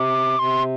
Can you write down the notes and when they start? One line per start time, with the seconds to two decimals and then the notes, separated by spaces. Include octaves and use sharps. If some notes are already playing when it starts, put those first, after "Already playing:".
Already playing: C3 D6
0.39 C3 C6